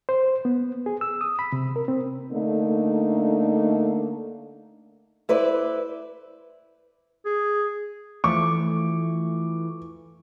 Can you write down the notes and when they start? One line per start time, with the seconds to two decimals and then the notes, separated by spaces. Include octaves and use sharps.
0.09 C5
0.45 B3
0.86 G#4
1.01 E6
1.21 D#6
1.39 B5
1.52 C3
1.76 A#4
1.88 C4
2.32 D3 A3 A#3 D4 D#4
5.29 E4 B4 C5 D5
7.26 G#4
8.24 E3 F3 A3 C#6 D6